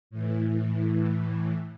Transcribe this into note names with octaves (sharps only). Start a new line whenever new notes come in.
A2 E3